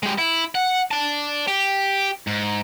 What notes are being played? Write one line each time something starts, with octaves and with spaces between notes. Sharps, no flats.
G#3 G4
E4
F#5
D5 A5
G4
G#2